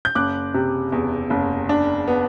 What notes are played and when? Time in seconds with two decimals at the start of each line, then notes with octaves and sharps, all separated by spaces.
0.05 G6
0.15 F#1 D6 F#6
0.54 C3
0.92 E2
1.30 F#1
1.69 D4
2.08 B3